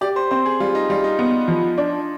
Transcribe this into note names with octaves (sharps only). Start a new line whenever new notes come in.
G4 D5
C5
C4 C5
G#4
G3 F4
D#4
G3 F4
D#4
B3
F3
D4